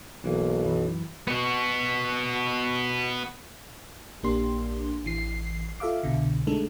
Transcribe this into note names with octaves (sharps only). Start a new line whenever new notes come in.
B1 E3 A#3
F#2 E3
B3 F#4
A#1 A#3 D4 G4 C6
A1 E3 C7
F4 A4 E5 F5 D6
C2 B2 D3
G#3 A3 D4 D#4 A4